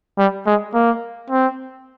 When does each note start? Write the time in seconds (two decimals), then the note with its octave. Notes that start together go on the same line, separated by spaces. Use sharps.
0.18 G3
0.46 G#3
0.74 A#3
1.30 C4